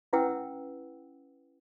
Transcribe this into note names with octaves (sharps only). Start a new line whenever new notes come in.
C#4 E4 B4 F#5 G5 E6